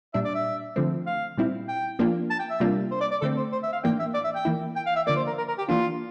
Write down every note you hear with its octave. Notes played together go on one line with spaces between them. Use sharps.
A#2 G3 D4 E5
D5
E5
D3 F3 A3 C4
F5
A#2 G3 C4 E4
G5
F3 A#3 D4 F4
A5
G5
E5
C3 G3 A#3 D4 F4
C5
D5
D5
D3 A3 C4 A4
C5
C5
E5
F5
A2 E3 A#3 D4 G5
E5
D5
E5
G5
E3 A#3 E4
G5
F5
E5
D3 F3 A#3 D5
C5
A#4
A#4
A#4
G4
E3 A#3 D4 F4